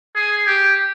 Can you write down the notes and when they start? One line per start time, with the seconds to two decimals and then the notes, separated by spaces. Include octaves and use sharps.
0.16 G#4
0.47 G4